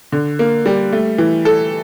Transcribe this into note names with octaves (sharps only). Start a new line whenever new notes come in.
D3
A#3
G3
A3
E3
A4